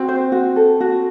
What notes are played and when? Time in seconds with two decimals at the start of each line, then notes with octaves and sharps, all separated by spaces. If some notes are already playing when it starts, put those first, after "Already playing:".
Already playing: C4 F#4
0.09 C5
0.32 F#4
0.56 A4
0.81 F#4